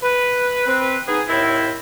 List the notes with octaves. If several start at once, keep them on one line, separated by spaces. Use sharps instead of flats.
B4
C4 B4
B3 D#4 G#4
D#2 A2 C4 E4